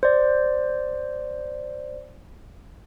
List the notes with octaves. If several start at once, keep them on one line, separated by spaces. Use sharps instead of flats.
C5 D5